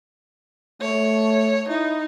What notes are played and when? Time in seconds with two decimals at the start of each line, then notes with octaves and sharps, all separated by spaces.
0.81 A3 C#5
1.69 D#4 E4